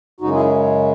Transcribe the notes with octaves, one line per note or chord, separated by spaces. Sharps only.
F#2 C#3 G#3 D#4 F#4
E4 G#4